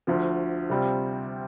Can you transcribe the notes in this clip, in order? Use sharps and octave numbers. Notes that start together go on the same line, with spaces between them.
D2 D3 F3
C3 G3 C4 F4